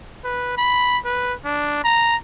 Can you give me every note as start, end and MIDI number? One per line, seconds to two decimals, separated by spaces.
0.24 0.56 71
0.57 0.98 83
1.05 1.33 71
1.45 1.83 62
1.84 2.16 82